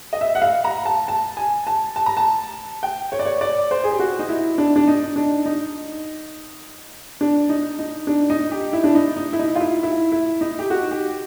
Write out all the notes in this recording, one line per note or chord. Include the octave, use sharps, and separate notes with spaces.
D#5
E5
F#5
F5
A#5
A5
A5
G#5
A5
A5
A#5
A5
G5
C#5
D5
C#5
D5
C5
G#4
G4
F#4
D#4
E4
D4
D4
D#4
D4
D#4
D4
D#4
D#4
D4
D#4
G4
E4
D4
D#4
D#4
E4
D#4
F4
E4
E4
E4
D#4
G4
F#4
G4